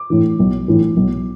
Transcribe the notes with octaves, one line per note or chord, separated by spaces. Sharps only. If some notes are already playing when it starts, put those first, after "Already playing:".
Already playing: D6
A2 E3
B1
A2 E3
B1